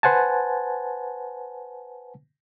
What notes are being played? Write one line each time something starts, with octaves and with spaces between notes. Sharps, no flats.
B4 C5 F#5 G#5 A5